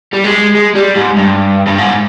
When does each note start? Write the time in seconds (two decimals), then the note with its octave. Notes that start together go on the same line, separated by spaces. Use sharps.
0.13 G3
0.24 G#3
0.55 G#3
0.75 G3
0.96 G#2
1.17 G2
1.67 G2
1.78 G#2